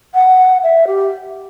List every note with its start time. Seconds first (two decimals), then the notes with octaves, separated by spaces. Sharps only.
0.14 F#5
0.63 E5
0.87 G4